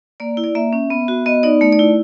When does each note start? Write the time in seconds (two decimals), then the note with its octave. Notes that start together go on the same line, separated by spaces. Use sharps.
0.20 A#3 D5
0.37 E4
0.44 D5
0.55 A#3 E5
0.73 C#4
0.90 B3
1.08 F#4
1.26 B3 D#5
1.43 D#4 D5
1.61 A3 D5
1.72 D5
1.79 E4